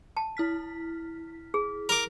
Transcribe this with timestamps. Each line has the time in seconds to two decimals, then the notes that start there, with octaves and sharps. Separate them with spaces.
0.17 A5
0.37 E4 F6 B6
1.54 G#4
1.89 A#4 D6